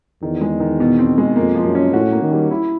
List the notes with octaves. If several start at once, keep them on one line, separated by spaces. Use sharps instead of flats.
E2 D#3
G#3
D#3
B2
C4
G#3
F2 A#3
F3
F#2
C#4
A2 F#4
A#3
D#3
G3
E4